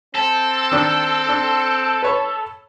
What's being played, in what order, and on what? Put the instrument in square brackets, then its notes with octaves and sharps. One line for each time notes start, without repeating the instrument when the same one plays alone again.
[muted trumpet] C4 [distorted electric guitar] A4
[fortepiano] D#3 D4
D4
B4 C#5